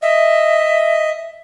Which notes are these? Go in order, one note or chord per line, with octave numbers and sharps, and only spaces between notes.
D#5 E5